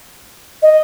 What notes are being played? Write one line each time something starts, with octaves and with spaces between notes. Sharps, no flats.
D#5